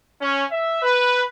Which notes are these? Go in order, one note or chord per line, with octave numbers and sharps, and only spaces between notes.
C#4
E5
B4